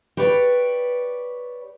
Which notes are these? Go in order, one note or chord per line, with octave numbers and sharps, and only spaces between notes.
G4 B4 C#5 D5